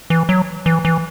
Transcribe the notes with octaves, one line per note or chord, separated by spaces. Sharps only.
E3
F#3
E3
E3